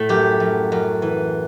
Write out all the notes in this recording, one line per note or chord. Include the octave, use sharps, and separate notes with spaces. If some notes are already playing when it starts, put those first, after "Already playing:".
Already playing: A2 A3
F#2 G4
F#2
F#2
E3